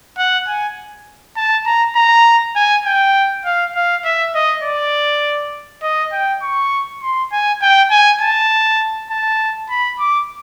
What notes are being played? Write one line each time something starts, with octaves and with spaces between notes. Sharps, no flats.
F#5
G#5
A5
A#5
A#5
G#5
G5
F5
F5
E5
D#5
D5
D#5
G5
C#6
C6
G#5
G5
G#5
A5
A5
B5
D6